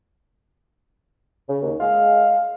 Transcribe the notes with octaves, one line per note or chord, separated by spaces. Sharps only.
C#3
D#2
G#3 F5